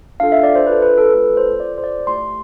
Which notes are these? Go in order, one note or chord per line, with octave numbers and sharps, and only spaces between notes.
D4 F4 A4 F5
E5
D5
C5
D4 F4 A4 B4
B4
A4
A3 C4 F4 A4 B4
C5
C4 F4 A4 D5
C5
D5
A3 E4 G4 C6